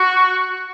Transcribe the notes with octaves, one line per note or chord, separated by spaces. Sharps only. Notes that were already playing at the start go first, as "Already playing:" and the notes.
Already playing: F#4